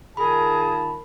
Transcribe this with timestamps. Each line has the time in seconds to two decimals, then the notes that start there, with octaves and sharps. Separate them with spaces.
0.17 D#3 F4 G#4 A#4 A5 B5